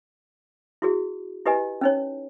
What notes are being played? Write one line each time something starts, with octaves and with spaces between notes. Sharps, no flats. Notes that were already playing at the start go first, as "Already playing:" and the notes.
E4 F#4 G#4
E4 G4 B4 D#5 G#5
C#4 D#4 C#5